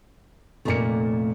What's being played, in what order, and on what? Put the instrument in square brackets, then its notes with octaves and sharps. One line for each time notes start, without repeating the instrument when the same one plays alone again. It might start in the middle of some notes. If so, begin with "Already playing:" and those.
[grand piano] F1 A#2 C#7 [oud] A3 A#3